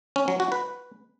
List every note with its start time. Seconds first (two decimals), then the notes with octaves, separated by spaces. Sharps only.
0.16 C#4
0.28 F#3
0.40 F#4
0.52 B4